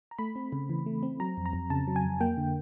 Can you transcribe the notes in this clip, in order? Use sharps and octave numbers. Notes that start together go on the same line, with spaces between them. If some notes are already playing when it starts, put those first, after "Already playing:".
A#5
A3 B5
C4
C#3
E3
A3
C4
F#3 A#5
F2
A#5
F2
C#3 A5
F#3
G#5
F2
A#3 G5
D3